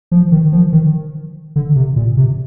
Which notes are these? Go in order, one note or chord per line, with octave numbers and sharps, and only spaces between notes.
F3
D#3
F3
D#3
D3
C3
A#2
C3